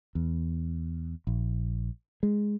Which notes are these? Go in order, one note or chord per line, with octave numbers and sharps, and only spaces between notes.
E2
A#1
G#3